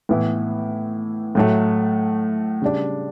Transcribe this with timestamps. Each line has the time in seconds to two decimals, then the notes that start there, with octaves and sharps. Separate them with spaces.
0.09 A2 E3 B3 E4
1.35 A2 F#3 A3
2.62 C#3 G3 D4